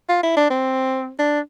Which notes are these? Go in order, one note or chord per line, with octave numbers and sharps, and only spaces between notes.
F4
E4
D4
C4
D4